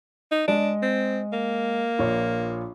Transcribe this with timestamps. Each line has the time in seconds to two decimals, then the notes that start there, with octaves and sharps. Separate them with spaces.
0.32 D#4
0.48 G#3 D4 D#5
0.82 C4
1.33 A#3
1.99 A#1 F4 C#5